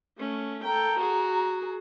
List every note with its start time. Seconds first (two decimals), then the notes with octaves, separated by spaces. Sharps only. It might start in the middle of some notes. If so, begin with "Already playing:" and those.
0.18 A3 C#4
0.65 A4 G5 A#5
1.00 F#4 G#4